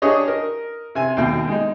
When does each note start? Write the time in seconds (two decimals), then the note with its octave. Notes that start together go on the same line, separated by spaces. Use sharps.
0.02 D4 G4 G#4 C#5 D#5
0.27 A#4 D#5
0.95 C3 G#5
1.17 D#2 B2 A3 G5
1.47 G#3 D#4